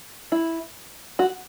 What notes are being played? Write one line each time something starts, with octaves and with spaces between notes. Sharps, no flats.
E4
F#4